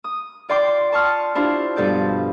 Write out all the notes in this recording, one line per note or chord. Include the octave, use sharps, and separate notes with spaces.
D#6
F4 D5 G5 C6 D6
G5 A5 C6 C#6 D#6 F6
D4 E4 F4 G4 C5
G2 B2 F3 A4 D5 G6